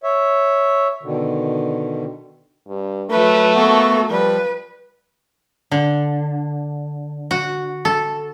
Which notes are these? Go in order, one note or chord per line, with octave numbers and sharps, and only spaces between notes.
C#5 E5
B2 D3 D#3
G2
F#3 A3 B4
A#3 B3 F#4 A4
F3 G3 B4
D3
F#4
A4